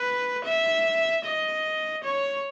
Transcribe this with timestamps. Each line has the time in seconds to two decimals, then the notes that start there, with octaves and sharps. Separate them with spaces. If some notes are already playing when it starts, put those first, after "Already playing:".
Already playing: B4
0.45 E5
1.24 D#5
2.03 C#5